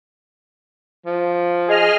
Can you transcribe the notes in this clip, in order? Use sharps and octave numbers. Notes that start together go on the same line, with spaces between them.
F3
G#4 D#5 F6